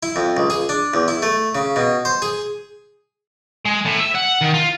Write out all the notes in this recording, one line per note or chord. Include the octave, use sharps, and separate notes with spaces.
E4
F2
C#2
G#4
D4
E2
E4
A3
C#3
B2
C5
G#4
G#3
A2
E5
F#5
D#3
F4